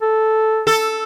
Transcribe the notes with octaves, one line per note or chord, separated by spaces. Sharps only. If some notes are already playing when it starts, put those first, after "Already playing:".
A4
A4